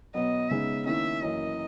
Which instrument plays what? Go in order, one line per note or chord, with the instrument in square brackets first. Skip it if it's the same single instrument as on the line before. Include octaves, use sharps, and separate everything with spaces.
[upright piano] B2 F#3 B3 [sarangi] D#5
[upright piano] C#3 G#3 B3 D#4 [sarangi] E5
[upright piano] D#3 A#3 C#4 E4 [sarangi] E5
[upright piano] F#2 E3 A#3 [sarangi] D#5